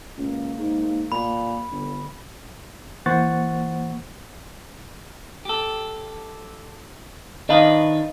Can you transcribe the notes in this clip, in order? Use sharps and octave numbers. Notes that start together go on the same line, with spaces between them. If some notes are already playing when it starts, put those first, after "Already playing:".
C#2 A#3
G#2
A#2 B5
G1 D3
E3 A#3 C5 F#5 C#6 A6
G4 A4
D#3 D4 B4 D#5 F5